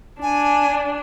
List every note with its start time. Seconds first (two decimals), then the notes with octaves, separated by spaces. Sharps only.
0.22 D4 G#5